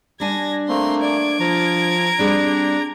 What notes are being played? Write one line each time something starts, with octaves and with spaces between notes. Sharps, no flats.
G3 D4 G#5 G#6 A#6
A3 A#3 C4 C6
D5 G#6 D7
F3 A#5
G3 C4 D4 G#4